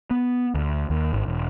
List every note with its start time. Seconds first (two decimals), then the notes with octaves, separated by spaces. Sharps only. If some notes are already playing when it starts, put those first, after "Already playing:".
0.11 B3
0.55 D2
0.90 D#2
1.13 G#1
1.26 E1